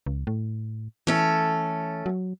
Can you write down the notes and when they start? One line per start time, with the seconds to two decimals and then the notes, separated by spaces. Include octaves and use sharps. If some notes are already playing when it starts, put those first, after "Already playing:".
0.06 C#2
0.27 A2
1.07 E3 A3 C#4 A4
2.06 F#3